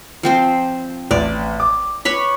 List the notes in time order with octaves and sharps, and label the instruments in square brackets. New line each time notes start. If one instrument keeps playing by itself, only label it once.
[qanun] F3 C4 C5
[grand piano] A1 [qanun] D5
[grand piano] D6
[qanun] B4 C#5 B5